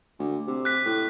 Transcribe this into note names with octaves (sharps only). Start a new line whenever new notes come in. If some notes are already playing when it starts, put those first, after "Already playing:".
D2
C3
F#6 B6
A2